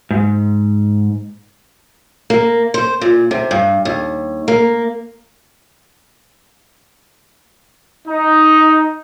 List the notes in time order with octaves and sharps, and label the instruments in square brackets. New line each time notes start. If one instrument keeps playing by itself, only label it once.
[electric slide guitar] G#2
[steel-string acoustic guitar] A#3
C5
A#2
C3
G2
D#2
A#3
[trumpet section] D#4